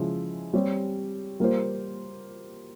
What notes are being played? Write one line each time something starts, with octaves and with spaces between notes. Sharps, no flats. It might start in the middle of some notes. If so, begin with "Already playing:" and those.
Already playing: C#3 F3 G#3 E4
G3 C4 G4 C#5
G3 A#3 F4 C5